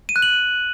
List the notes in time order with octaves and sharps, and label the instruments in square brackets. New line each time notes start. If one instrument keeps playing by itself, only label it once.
[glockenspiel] D#7
F#6
F#7